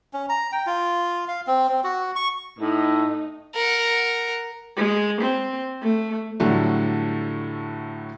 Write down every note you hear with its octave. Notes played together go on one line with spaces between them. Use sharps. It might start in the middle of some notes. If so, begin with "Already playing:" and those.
C#4
A#5
G5
F4
F5
C4
C4
F#4
C#6
A2 D#4
A#4 F#5
G#3
C4
A3
A2 D3 F#3 G3 A3